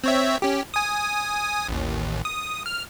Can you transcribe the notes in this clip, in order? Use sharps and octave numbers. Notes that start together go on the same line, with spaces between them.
C4 C#5 E5
C#4 G4
G#5 D#6
A1 D#2
D#6
F6